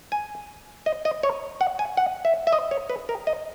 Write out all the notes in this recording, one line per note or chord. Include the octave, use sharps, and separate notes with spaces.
G#5
D#5
D#5
C#5
F#5
G#5
F#5
E5
E5
D#5
C#5
B4
A#4
D#5